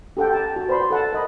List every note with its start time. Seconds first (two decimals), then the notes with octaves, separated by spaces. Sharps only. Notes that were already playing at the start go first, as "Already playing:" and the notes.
0.17 G4 A4 F#5 G5
0.33 A5 A#5
0.56 F#4 A5
0.69 B4 C5 D5 B5 C6
0.91 A4 F#5 A5
1.13 A#4 D#5 B5